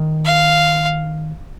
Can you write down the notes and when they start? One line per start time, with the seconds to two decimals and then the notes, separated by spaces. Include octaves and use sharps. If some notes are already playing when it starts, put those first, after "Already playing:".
Already playing: D#3
0.25 F5